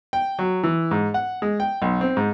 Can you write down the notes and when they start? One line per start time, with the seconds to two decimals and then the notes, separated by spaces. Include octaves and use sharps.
0.13 G5
0.39 F#3
0.63 E3
0.91 G#2
1.14 F#5
1.42 G#3
1.60 G5
1.82 B1
2.01 C4
2.17 G#2